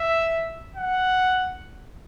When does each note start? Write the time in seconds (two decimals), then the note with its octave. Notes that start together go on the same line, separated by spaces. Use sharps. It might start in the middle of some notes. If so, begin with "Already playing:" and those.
Already playing: E5
0.76 F#5